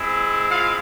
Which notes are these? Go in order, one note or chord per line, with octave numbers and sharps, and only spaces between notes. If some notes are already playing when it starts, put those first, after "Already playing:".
Already playing: G#3 C4 E4
F4 F5